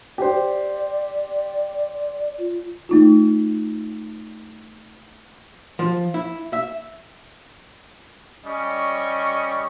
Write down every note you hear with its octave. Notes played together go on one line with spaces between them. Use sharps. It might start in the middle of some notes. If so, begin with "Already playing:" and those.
G4 C5 D5
F4
A3 D#4 F4
F3
E4
E5
G3 C#4 D#5 C#6